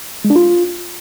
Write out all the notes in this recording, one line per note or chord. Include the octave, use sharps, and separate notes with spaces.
G#3
D4
F4